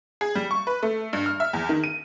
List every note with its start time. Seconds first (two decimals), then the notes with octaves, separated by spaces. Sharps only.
0.21 G#4
0.35 G3
0.51 C#6
0.67 B4
0.83 A3
1.13 G2
1.26 F6
1.40 E5
1.53 E2
1.69 D#3
1.84 D#7